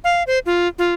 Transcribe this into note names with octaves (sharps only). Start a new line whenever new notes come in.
F5
C5
F4
F4